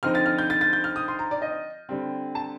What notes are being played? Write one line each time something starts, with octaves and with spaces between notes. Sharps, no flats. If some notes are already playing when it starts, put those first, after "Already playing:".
D3 F3 C4 D#4 F6
A6
F6
G6
A6
A6
G6
F6
D#6
C6
A#5
D5
D#5
D3 G3 C4
A5